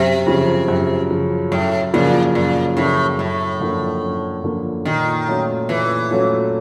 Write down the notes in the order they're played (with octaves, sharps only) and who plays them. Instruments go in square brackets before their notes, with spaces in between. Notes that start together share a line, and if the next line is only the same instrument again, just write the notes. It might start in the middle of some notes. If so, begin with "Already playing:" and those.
Already playing: [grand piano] F#2 [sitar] C3
[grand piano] C#3 F3
F#2
C#3 F3
[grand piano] F#2 [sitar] A2
[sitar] A#2 [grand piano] C#3 F3 A#3
[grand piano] F#2 [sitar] A#2
[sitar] A2 [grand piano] C#3 F3 A#3
[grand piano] F#2 [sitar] A2
[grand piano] D3 F3 A#3
F#2
D3 F3 A#3
[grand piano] A#2 [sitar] D#3
[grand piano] F#3 A3 C#4 F4
[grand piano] A#2 [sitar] E3
[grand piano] F#3 A3 C#4 F4